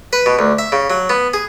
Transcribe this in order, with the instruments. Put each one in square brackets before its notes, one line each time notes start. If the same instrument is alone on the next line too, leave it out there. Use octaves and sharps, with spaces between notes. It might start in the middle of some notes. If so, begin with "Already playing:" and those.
[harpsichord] B4
B2
D2
E5
C#3
F#3
B3
G#4